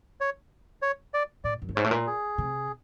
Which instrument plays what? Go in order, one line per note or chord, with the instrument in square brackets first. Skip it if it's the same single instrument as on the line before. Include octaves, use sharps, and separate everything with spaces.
[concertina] C#5
C#5
D5
[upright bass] A2 [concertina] D5
[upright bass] F#2
G2
[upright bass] G#2 [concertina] C#5
[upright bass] A2
A#2
[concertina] G#4
[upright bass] C3